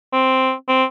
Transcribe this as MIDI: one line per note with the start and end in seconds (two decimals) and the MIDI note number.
0.13 0.52 60
0.68 0.84 60